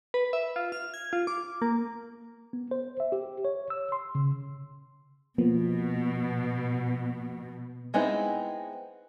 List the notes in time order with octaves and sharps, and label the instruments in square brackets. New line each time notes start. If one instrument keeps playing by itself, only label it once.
[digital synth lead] B4
E5
F4
F6
G#6
F4
D6
A#3
[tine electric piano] B3
C5
E5
G4
C#5
E6
C6
C#3
[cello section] B2 [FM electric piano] F3 A#3 B3
[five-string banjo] G#3 B3 C4 D#4 E4